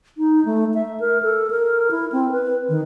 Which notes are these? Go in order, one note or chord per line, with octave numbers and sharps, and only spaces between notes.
D#4
A3
E5
A#4
A4
A#4
E4
C4
B4
D#3